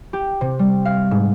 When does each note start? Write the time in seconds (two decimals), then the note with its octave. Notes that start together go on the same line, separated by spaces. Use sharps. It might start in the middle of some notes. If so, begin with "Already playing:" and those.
0.13 G4
0.41 C3
0.59 G3
0.85 F5
1.11 G#2